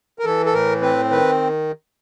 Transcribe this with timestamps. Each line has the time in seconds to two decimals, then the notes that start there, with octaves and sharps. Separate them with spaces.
0.19 A#4
0.24 E3 A4
0.46 A4
0.53 A2 A#4
0.81 C4 B4
1.10 D#3 B4